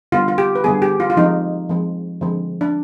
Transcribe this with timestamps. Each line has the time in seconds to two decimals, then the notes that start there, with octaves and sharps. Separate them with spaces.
0.12 D3 G3 B3 F4
0.28 F4
0.38 G4
0.55 B4
0.64 D3 G3 B3 G#4
0.82 G4
1.00 F4
1.10 F4
1.17 F3 G#3 C4 D#4
1.69 F3 G#3 C4
2.21 D3 F3 G#3 C4
2.61 D4